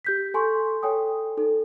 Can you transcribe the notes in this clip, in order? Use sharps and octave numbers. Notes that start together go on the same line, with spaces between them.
G4 G6 B6
A4 G#5 C6 C#6
A4 C#5 G5 G#5 D#6
D#4 A4